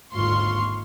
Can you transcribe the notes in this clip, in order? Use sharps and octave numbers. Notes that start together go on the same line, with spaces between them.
G#1 D#2 D3 F4 C6 C#6